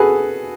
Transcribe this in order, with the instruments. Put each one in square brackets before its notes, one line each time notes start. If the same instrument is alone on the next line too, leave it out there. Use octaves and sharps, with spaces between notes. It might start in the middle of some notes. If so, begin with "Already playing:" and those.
Already playing: [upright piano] F#4 G#4 A4 B4